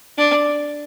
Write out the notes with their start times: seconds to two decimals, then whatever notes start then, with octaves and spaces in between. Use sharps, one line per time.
0.18 D4